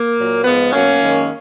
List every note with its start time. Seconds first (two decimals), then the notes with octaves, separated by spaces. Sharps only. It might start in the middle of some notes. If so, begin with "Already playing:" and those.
Already playing: A#3
0.17 A#2 F#3
0.44 G#2 F3 G#3 B3
0.73 B2 F#3 A#3 C#4
1.01 F#2 D#3 G#3